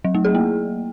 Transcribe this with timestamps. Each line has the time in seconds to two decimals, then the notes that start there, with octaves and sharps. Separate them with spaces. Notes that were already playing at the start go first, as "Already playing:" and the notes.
0.04 F#3
0.15 A3
0.25 G#4
0.35 A#3